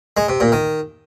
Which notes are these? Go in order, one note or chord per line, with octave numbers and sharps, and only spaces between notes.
G#3
C3
A#2
D#3